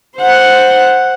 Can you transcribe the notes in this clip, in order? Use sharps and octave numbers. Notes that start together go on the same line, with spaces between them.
C5 F#5